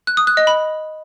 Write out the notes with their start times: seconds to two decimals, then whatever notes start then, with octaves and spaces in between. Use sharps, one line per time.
0.07 F#6
0.17 D#6
0.27 F#6
0.37 D#5
0.47 B5